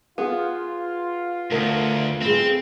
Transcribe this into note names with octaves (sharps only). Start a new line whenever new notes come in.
B3 F4 G#4
D2 A3 B3 A#4
C4 G#4 B4 F5